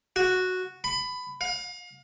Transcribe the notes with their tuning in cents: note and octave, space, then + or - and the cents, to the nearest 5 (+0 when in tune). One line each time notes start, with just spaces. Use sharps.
F#4 -5
B5 +20
F5 +35